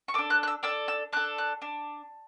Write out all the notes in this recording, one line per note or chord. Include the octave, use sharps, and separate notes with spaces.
C#6
D4 A4 D6
F#6
F#6
E6
D4 A4 E6
E6
D4 A4 F#6
F#6
D4